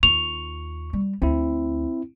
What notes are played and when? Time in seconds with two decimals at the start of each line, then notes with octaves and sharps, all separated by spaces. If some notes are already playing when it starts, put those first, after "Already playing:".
0.03 D#2 F4 C#6 F7
0.93 G3
1.22 D2 C4 E4